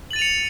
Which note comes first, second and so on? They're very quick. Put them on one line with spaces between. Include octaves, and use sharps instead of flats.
F#7 A6 D#7 F7 C#7